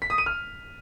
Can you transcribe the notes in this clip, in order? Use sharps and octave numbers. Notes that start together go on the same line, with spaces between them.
B6
D#6
D#7
F6